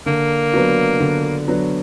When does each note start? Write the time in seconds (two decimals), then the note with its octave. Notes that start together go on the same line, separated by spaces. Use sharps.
0.06 D3 A#3
0.53 F#3 B3 D4 F#4
1.00 D3
1.48 F#3 B3 D4 F#4